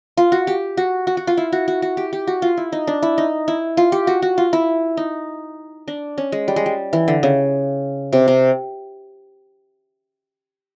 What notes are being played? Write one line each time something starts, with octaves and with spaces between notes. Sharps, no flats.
F4
F#4
G4
F#4
F#4
F#4
F4
E4
F#4
F#4
F#4
G4
G4
F#4
F4
E4
D#4
D4
E4
D#4
E4
F4
G4
F#4
F#4
F4
E4
D#4
D4
C#4
G#3
G3
G#3
G3
E3
D3
C#3
C3
C3